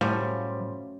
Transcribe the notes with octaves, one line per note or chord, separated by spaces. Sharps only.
F#2 A2 F3 G3 A3 C#4